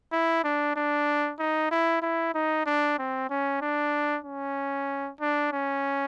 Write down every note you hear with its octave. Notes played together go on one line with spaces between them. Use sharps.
E4
D4
D4
D#4
E4
E4
D#4
D4
C4
C#4
D4
C#4
D4
C#4